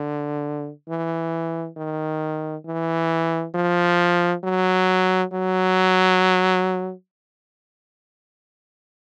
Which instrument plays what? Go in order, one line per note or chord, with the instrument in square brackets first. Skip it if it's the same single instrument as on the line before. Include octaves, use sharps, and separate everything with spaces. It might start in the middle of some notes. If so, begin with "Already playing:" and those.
Already playing: [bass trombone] D3
E3
D#3
E3
F3
F#3
F#3